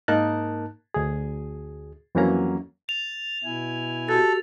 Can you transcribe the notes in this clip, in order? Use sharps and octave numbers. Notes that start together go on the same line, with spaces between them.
G#2 A#3 D#4 A#4 A5 F#6
D2 G#4
F2 E3 F#3 A#3 C#4 A#5
A6 F7
B2 E4 G#5
F#4 G4 A4 A6